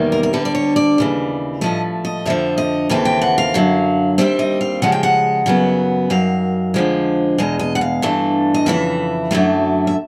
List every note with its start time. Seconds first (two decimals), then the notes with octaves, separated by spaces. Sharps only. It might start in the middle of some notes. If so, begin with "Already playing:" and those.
Already playing: E2 C3 D#3 G3 A#3
0.12 A#4
0.23 A#4
0.33 D2 D3 G3 B4
0.45 D5
0.55 C#5
0.76 D5
0.98 D#2 C#3 E3
1.61 A2 F3 A3 D#5
2.05 D#5
2.26 F2 D3 F3 E5
2.58 D#5
2.89 D#2 C#3 E3 A3 C4
3.05 G5
3.21 F#5
3.38 F5
3.54 F#2 D3 F#3
4.18 D#2 D#3 G3 C4 E5
4.39 D#5
4.61 F5
4.82 C#3 F3 G#3 F#5
4.92 G5
5.03 F#5
5.46 F#2 C#3 F#3 B3
6.10 F#2 D#3 F#3 F5
6.74 F2 D3 F3 G#3
7.38 E2 B2 G#3 D#5
7.59 D#5
7.75 F#5
7.81 F5
8.02 G2 E3 A3 D4
8.54 D#5
8.66 F2 C#3 E3 E5
9.31 F#2 D3 F#3 A3
9.87 E5